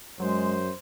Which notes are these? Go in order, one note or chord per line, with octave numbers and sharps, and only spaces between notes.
F#2 F#3 G#3 C5